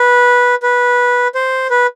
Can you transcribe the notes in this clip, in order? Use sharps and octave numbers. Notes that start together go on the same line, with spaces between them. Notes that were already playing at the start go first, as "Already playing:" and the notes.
Already playing: B4
B4
C5
B4